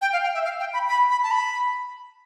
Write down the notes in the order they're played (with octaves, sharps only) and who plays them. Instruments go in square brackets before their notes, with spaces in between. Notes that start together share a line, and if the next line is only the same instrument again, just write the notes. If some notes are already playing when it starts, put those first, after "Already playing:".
[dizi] G5
F5
G5
E5
F5
G5
B5
B5
B5
A5
B5